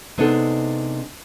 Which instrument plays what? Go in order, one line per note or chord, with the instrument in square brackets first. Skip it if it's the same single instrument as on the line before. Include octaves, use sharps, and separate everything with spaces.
[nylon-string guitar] C3 G#3 B3 D4 D#4 A4